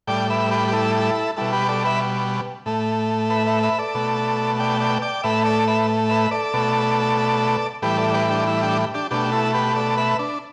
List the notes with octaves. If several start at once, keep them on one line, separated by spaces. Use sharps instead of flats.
A2 G3 D5 G5
B4 E5
G4 B4
G4
E4 A4
B2 G3 E4 A4
G4 B4
A4 D5
B4 E5
A2 A3
B4 E5
B4 E5
B4 E5
A4 D5
B2 A3
D5 G5
D5 G5
D5 G5
A2 A3 B4 E5
A4 D5
B4 E5
B4 E5
A4 D5
B2 A3
A2 E3 G3 G4 B4
A4 D5
D5
G4 B4
D4 G4
E4
D4 G4
D4 G4
B2 A3 D4 G4
E4 A4
G4 B4
A4 D5
B4 E5
D4